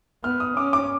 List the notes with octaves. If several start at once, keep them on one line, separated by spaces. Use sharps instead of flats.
B3 F6
D#6
C#4 D6
D6